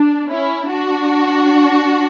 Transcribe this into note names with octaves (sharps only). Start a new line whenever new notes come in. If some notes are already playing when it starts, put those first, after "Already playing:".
Already playing: D4
C#4 E4
D4 F#4